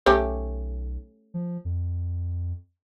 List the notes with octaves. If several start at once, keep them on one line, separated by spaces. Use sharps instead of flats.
B1 A3 C#4 G4
F3
F2